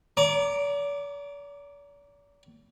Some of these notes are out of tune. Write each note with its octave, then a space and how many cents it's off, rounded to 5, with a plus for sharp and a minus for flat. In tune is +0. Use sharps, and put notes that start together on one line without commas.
D5 -45 A#5 +0 D6 +0